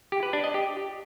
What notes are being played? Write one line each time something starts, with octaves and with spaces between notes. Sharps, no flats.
G4
B4
D4
D#5
G4